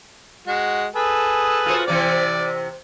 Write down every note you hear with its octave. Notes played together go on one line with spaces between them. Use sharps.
G#3 F#4
G#4 A4 B4
F4 F#4 C5
C3 E3 C4 D5